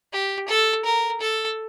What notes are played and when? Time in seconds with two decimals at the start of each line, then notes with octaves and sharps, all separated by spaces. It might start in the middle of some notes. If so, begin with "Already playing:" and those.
0.13 G4
0.48 A4
0.85 A#4
1.21 A4